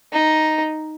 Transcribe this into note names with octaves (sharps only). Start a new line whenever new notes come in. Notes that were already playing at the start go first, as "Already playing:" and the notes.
D#4